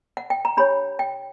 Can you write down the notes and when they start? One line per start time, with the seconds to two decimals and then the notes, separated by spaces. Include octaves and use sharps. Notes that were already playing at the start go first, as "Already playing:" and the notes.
0.17 F#5
0.30 G5
0.45 A#5
0.57 D4 G4 C#5 B5
0.99 G5